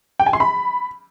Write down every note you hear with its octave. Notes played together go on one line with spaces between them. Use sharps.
G5
G#5
C6
B5